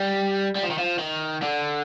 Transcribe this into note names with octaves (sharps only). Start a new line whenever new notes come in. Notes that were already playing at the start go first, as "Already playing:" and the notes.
Already playing: G3
G3
F3
D#3
F3
D#3
D3